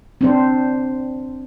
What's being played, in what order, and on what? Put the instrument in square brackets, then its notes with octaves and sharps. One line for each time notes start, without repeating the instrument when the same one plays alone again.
[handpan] C4 D4 C5